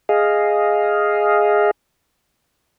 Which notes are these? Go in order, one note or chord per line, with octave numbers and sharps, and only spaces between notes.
G#4 D#5 F5